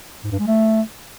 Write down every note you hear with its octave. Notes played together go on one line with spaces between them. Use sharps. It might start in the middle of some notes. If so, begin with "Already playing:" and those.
G#2
G2
G#3
A3